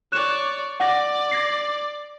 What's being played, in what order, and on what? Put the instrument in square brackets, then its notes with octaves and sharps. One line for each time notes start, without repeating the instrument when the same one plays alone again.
[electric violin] C#5 D5 [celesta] F#6 E7
[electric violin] D5 [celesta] F#5 A#6
[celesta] G#6 A#6 C7